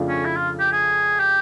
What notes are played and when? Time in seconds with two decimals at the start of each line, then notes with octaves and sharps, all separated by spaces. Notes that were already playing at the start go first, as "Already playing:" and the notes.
Already playing: F2 C#3 F3 A3 D4
0.09 C#4
0.24 E4
0.36 F4
0.60 G4
0.72 G#4
1.20 G4